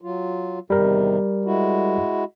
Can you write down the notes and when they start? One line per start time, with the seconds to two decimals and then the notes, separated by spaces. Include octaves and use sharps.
0.01 F#3 F4
0.70 E2 C3 D#3 G3 A#4
1.45 G#3 E4 F#4